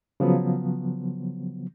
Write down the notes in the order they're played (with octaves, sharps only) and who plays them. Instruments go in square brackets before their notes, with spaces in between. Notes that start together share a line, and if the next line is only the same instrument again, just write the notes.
[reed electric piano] C#3 F3 F#3 B3